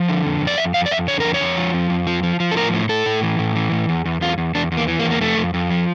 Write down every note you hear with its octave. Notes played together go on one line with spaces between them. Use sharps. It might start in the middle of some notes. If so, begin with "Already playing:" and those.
Already playing: F3
D3
F2
F2
D5
F2 E5
F2 F5
D5
F2 E5
D3 C#5
F2 A#4
C#5
F2
F3
F2
F2
F3
F3
F3
A4
A2 A#4
A2
A2 A4
A2
E3
A2
E3
A2
E2
E2
E2 F4
E2
E2 D4
E2
A#3
E3
A#3
E2
A#3
F2 A3
F2
F2
F3